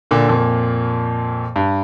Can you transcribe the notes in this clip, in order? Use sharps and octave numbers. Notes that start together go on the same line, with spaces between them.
A#2 D3
F2 A#2
G2